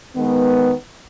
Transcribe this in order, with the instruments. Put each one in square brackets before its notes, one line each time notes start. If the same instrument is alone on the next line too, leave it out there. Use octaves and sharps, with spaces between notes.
[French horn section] D#3 G#3 B3